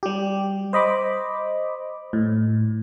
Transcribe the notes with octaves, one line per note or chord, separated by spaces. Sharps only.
G3 G4
C5 D#5 B5 D6
A2